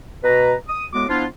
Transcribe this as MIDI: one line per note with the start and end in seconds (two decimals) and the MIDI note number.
0.24 0.54 47
0.24 0.54 71
0.24 0.54 82
0.68 0.86 87
0.93 1.04 45
0.93 1.04 56
0.93 1.04 59
0.93 1.04 66
0.93 1.04 86
1.09 1.25 53
1.09 1.25 59
1.09 1.25 62
1.09 1.25 64
1.09 1.25 65